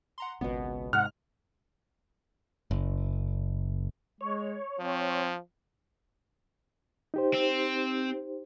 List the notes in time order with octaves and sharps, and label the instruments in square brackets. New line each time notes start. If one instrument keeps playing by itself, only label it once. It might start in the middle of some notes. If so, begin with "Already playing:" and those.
[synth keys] F#5 A#5 C6
[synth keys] G#1 B3 [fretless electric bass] C#2 B2
[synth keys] G#2 C3 G#3 [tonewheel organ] F#5 [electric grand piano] F6
[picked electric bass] F#1
[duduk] G#3 [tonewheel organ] C#5
[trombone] F3 [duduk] C4
[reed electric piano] D#4 G4 C5
[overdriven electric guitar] C4